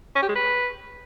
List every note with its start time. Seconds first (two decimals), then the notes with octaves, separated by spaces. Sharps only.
0.16 C#4
0.22 G4
0.29 G#3
0.35 B4